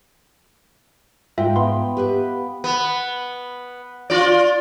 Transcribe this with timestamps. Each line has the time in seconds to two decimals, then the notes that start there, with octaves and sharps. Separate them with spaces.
1.38 G#2 F4 E5 F5 G5
1.56 B3 C6
1.97 G4 B4 E5
2.64 B3
4.10 F4 D5